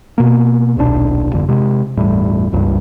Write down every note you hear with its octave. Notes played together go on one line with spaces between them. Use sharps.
B2 A#3
D#1 B1 A2 D4
G1 F2 D3
C3 G#3
G1 E2 A2 G3
F#1 C#2 G2